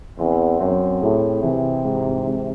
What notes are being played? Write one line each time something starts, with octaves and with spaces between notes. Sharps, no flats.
E2 C4
F#2 C4
A2 G#4
C3 E3
G#2
G#2